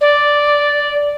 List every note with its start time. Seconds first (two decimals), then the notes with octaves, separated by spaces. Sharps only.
0.01 D5